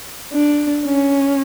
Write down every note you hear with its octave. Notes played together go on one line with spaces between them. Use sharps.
D4
C#4